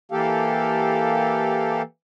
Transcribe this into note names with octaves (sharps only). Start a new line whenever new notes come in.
E3 A#3 G4 A4 F5